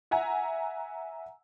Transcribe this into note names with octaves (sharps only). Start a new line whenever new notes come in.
E5 F#5 G#5 A#5